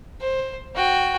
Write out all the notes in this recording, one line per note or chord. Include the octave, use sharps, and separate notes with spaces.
C5
F#4 G5